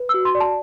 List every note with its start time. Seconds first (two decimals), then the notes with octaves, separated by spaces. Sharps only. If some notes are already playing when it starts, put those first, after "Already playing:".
Already playing: B4
0.09 F#4 E6
0.25 C6
0.35 D5
0.40 A5